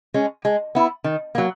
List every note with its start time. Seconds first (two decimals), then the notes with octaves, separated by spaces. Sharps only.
0.14 G#3 C#4
0.45 G#3
0.75 B3 E4
1.04 D#3
1.35 F#3 A#3